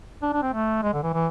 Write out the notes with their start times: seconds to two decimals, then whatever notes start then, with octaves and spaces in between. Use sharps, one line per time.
0.23 D4
0.33 D4
0.42 C4
0.54 A3
0.83 G#3
0.93 D3
1.03 E3
1.14 E3